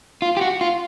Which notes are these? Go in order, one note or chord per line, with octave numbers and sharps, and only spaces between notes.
F4
G4
F#4
F4